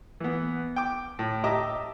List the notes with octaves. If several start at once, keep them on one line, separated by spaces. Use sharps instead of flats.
E3 B3
G5 D6
A2
G4 D#5 E5 A5 A#5 D6